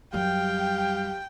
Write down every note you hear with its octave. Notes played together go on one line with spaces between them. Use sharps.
F#2 G3 G4 F5 G5